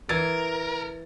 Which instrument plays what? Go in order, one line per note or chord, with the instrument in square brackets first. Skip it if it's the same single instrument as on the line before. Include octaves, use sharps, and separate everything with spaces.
[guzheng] E3 [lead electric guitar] A#4 [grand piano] G#6 A6